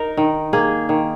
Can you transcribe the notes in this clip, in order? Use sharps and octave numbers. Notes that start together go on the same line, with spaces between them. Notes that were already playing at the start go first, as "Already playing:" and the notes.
Already playing: D#4 A#4
D#3
A#3 G#4
D#3